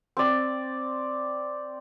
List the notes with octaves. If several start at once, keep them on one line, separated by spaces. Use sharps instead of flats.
C4 D5